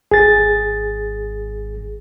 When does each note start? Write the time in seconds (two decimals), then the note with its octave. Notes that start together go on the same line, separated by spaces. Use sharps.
0.11 G#1 G#4 A6